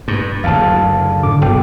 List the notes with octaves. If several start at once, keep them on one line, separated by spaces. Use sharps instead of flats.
G2
F#1 D2 F5 A5
A2 D3 D6
F#1 G2 B2 G5